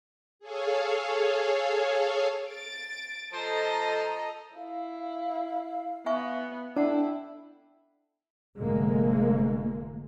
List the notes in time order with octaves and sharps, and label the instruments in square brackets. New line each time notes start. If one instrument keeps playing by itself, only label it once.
[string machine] G#4 A4 C#5 F5
[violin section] A6 D7
[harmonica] F3 C5 [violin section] A4 D#5 A#5
[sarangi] E4 [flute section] F5
[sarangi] B3 [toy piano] E5 G#5 C#6
[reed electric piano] D4 [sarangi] E4 [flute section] A4 G5 [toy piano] F#5 A5
[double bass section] F1 G#2 D3 G#3 A#3